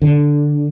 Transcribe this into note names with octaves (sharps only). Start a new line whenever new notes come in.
D3